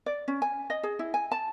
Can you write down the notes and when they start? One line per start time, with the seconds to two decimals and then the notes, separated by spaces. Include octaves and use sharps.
0.06 D5
0.28 C#4
0.42 G#5
0.70 D#5
0.83 G#4
0.99 E4
1.14 G#5
1.32 A5